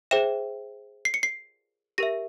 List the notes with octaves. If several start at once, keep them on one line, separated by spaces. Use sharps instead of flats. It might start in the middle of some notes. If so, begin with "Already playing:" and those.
G#4 C5 E5 G5 E7
C7
C#7
C7
G4 A#4 E5 A#6